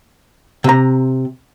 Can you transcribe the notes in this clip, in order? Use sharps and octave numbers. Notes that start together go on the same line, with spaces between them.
C3 A#5